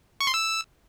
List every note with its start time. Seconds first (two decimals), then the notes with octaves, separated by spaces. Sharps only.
0.20 C#6
0.27 C6
0.34 E6